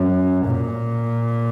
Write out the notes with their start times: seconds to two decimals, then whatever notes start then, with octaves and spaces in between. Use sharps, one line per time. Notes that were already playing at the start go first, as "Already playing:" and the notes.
Already playing: F#2
0.45 A#2